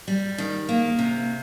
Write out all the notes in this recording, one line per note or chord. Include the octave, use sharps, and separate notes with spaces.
G3
D#3
A#3
C3